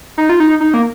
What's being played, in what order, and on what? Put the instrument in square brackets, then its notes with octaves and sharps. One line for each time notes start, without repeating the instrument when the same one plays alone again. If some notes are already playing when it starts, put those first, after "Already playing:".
[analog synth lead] D#4
F4
D#4
D#4
A#3